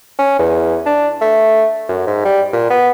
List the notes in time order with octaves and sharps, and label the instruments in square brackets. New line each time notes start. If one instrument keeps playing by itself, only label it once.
[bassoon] C#4
E2
D4
A3
F#2
G#2
G3
A#2
B3